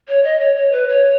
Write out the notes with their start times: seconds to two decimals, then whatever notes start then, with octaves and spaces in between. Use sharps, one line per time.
0.08 C#5
0.24 D#5
0.40 C#5
0.56 C#5
0.72 B4
0.89 C#5